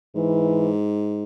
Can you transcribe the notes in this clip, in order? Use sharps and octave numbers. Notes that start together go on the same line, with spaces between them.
G#2 E3